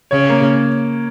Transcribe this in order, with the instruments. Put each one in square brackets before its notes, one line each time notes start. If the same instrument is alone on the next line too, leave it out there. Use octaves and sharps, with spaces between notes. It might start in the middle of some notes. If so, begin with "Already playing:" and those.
[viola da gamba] C#3 [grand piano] C#5
[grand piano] A#3